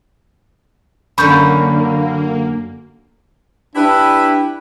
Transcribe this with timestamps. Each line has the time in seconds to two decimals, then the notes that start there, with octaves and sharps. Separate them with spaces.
1.18 F#2 D3 A#3 B5 C#6 G6
3.76 D4 E4 G4 B4